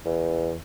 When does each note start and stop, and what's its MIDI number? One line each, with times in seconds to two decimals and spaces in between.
0.05 0.55 40